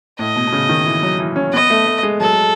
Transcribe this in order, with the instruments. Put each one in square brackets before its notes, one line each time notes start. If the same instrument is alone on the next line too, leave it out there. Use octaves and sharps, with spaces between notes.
[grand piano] A2 [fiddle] D#5
[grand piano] B2
B2
C#3
D#3
E3
F#3
E3
C#4
[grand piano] B3 [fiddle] D#5
[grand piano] A3
A3
G#3
[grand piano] F#3 [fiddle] A4